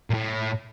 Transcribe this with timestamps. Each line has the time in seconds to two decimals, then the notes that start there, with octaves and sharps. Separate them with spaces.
0.10 A#2
0.14 A2